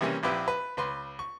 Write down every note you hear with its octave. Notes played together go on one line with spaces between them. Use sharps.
C3 E3 G3 A#3 C#4
A#1 C4 E4 G4 B4
B4
C#2 B4 C6
C#6